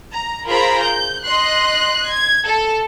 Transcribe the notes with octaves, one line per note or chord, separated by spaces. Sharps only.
A#5
F4 G#4 A#4 C5 A#5 B5
G6
D#5 C6 F#6
G#6
A4